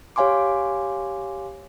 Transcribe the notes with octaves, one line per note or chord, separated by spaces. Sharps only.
G4 C#5 F5 G#5 C6 D6